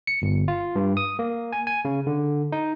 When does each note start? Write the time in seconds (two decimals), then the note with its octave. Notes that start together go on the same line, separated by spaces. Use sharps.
0.07 C#7
0.22 G1
0.48 F4
0.75 G2
0.97 D#6
1.19 A#3
1.52 G#5
1.67 G#5
1.85 C#3
2.07 D3
2.52 D#4